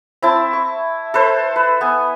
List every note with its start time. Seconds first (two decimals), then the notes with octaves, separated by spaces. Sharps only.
0.22 C4 E4 A5
0.53 C#6
1.14 A4 B4 C5
1.56 B4
1.81 B3 G#5